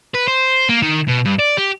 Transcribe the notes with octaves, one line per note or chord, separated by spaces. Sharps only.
B4
C5
A#3
D#3
B2
G2
D5
G4